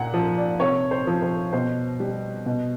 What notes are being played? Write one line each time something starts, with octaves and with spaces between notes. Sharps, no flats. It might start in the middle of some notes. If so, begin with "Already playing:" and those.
Already playing: A#2 F#5
F3
D5
C3 C#5
C5
F3
C5
B2 C5
G3
B2